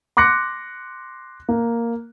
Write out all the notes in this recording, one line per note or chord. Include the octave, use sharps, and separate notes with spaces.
C6 D6 F#6 A#6 C#7
A#3